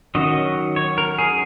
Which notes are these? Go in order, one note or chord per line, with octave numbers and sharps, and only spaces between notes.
D#3 F#3 C#4 D#5
C#5
A#4
G#4